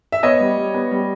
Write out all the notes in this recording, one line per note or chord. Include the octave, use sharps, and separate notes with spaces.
E5
B3 C#5 D#5
G3
G3
B3
G3